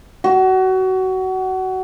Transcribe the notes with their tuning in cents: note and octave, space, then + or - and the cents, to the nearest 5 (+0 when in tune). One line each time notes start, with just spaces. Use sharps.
F#4 +25